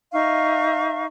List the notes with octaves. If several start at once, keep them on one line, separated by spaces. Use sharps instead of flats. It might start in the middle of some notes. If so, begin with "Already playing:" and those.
D#4 E5 F5 C#6